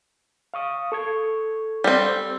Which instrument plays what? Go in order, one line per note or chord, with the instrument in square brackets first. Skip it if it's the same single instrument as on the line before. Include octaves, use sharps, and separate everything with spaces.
[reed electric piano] F5 C#6 D#6
A4 C#6 G#6
[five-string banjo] G3 C4